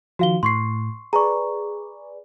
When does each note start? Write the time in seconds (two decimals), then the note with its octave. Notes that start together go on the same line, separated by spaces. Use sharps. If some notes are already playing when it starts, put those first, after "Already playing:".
0.19 D#3 F3 F#4 F5 G7
0.43 A2 C6 C#6 C7
1.13 G#4 B4 D5 A#5 C#6